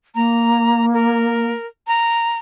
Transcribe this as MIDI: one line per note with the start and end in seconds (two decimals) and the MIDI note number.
0.15 1.51 58
0.15 0.85 82
0.94 1.66 70
1.88 2.38 82